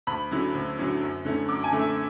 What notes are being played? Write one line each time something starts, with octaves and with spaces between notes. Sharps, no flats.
D2 B5
D3 F#3 C#4 E4
D2
D3 F#3 C#4 E4
F#2
D3 A3 C#4 E4
F#2 D6
G#5
D3 A3 C#4 E4
E5